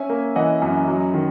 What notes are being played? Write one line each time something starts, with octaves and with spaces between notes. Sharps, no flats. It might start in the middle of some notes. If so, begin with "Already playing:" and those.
Already playing: C#4 E5 G#5
A#3
E3 D#5 F#5
F#2
F#3
D#3